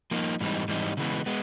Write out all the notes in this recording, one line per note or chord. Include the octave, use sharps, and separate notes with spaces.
F3 A#3 D#4
G#2 E3 G3 C4 D#4
G#2 E3 G3 C4 D#4
C#3 E3 G#3 B3
G#3 B3